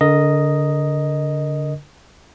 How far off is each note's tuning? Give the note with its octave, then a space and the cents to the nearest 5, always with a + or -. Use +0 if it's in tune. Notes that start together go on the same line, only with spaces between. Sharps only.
D3 -25 A#4 +0 D#5 +0